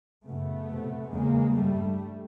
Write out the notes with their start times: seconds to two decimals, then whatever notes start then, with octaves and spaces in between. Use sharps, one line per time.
0.26 F#2 C#3 A3 B3
0.69 F2 C3
1.12 E2 C#3 G#3 A#3
1.55 G2 G3 A3